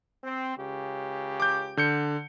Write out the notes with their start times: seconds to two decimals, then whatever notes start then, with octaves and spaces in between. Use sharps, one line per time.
0.24 C4
0.57 C#2 C#3 G4
1.40 D6 G6
1.77 D3 G6 C#7